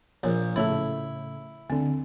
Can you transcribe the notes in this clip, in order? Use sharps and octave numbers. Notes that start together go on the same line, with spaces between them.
A#1 A#4 C#5
A2 C#3 A3 E4 A4 C#5
D2 D3 C4